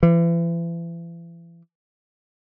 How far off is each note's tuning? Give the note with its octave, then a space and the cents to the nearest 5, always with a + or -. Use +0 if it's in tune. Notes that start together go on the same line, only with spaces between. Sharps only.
E3 +40